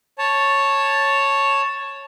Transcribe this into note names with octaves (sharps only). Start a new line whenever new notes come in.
C#5 A5